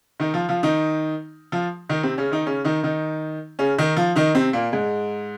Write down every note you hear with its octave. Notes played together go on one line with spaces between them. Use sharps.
D#3 D#4
F3 F4
F3 F4
D#3 D#4
F3 F4
D#3 D#4
C3 C4
C#3 C#4
D#3 D#4
C#3 C#4
D#3 D#4
D#3 D#4
C#3 C#4
D#3 D#4
F3 F4
D#3 D#4
C3 C4
A#2 A#3
G#2 G#3